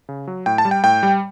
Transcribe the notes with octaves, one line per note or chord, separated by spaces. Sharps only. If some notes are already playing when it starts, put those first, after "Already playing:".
C#3
F#3
A2 G5
A5
G3
G5
A2 G5
G3